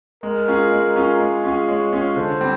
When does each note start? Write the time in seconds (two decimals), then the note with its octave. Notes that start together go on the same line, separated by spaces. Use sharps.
0.23 G#3 A#4
0.48 C#4 F4 G#4
0.72 G#3
0.96 C#4 F4 G#4
1.20 G#3
1.44 C#4 F4 G#4
1.68 G#3 C#5
1.93 C#4 F4 G#4
2.16 D3 C5
2.41 G3 C4